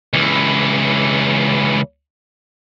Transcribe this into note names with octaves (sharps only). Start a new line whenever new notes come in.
C#2 E3